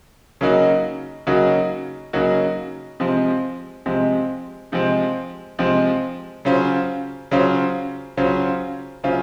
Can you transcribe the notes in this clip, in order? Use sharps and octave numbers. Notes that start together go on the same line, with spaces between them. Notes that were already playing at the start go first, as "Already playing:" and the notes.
C#3 F#3 A#3 D#4 F#4
C#3 F#3 A#3 D#4 F#4
C#3 F#3 A#3 D#4 F#4
C3 F3 G#3 C4
C3 F3 G#3 C4
C3 F3 G#3 C4
C3 F3 G#3 C4
C#3 F#3 C#4 F4 C5
C#3 F#3 C#4 F4 C5
C#3 F#3 C#4 F4 C5
C#3 F#3 C#4 F4 C5